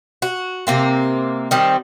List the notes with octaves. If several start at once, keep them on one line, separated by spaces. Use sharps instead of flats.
F#4
C3 A#3 C4
D#3 G3 C4